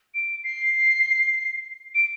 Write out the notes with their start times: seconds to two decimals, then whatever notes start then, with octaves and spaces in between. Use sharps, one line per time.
0.14 D7
0.44 C7
1.95 D7